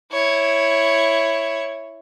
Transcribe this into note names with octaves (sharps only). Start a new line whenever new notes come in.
E4 C#5